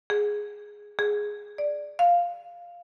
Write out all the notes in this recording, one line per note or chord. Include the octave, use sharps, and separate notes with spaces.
G#4
G#4
D5
F5